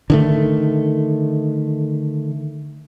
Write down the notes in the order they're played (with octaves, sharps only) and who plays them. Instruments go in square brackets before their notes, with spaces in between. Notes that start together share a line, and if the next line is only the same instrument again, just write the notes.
[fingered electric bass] D3 D#3 A3